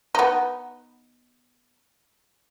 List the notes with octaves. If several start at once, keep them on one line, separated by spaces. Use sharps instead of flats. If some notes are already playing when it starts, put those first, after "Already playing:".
B3 D#4